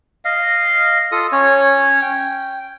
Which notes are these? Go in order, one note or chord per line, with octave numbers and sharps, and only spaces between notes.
D#5 F5
F4 A4 D#6
C#4 C#5
G5